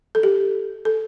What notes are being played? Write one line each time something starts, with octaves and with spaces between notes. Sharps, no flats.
A4
G4
A4